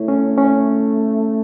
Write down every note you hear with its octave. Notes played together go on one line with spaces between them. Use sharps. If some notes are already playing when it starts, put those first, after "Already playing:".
Already playing: A3 E4 C#5
C#4
C#4